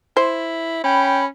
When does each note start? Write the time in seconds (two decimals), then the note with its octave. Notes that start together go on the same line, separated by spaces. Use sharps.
0.17 E4 C5
0.84 C#4 G5 B5